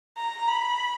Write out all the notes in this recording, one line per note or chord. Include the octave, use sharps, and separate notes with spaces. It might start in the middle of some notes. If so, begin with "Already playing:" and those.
A#5
B5